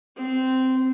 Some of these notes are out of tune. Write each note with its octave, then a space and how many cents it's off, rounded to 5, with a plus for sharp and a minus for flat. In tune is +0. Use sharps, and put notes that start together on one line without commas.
C4 -15